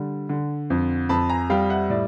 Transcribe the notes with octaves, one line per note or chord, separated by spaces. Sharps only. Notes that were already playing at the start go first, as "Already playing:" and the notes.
Already playing: D3 G3
D3
F2
F2 A5 B5
G#5 A#5
G3 F5 G5
E5 F#5
A2 D5 E5